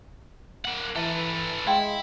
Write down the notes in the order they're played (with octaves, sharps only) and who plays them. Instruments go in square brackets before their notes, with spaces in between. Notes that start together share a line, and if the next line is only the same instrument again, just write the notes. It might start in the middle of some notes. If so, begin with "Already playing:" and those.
[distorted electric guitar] A#3 F#5
[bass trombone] E3 [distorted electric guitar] A4 B4 [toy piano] E5 A#5
[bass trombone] G#3 [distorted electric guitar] E4 [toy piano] F5 G5 C6